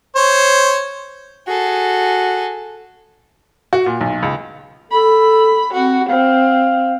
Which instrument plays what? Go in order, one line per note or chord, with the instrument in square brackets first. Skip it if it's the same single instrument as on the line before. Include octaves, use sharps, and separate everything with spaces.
[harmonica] C5 C#5
[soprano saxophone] F#4 [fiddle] G#4 A4
[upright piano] F#4
A#2
B1
C#2
[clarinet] A4 [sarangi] B5
[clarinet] C4 [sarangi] F#4
[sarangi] C4 [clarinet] F5